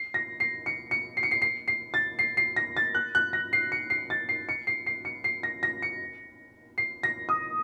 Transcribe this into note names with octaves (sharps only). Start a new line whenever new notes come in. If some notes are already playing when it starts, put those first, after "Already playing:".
Already playing: C7
A#6
C7
C#7
C#7
C7
C#7
C7
C7
C7
A6
C7
C7
A#6
A6
F#6
F#6
A#6
C7
C#7
C7
A6
C7
C#7
C7
C7
C#7
C7
A#6
A#6
C#7
C7
A#6
D#6